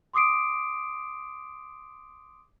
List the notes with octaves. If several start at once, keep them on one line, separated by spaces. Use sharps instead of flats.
C6 D6 D#6 C7 D7